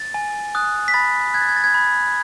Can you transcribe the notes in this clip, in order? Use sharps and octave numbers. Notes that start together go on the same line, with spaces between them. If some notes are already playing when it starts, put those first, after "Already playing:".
Already playing: A6
G#5
D#6 F#6
B6
B5 A6
F#6 G#6
A6
G#6
A6
G#6
B5